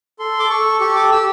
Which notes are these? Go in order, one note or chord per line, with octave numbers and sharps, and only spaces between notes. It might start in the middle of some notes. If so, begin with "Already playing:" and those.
A4 C6
D6
A4 C#6
G4 C#6
D6
G4 E6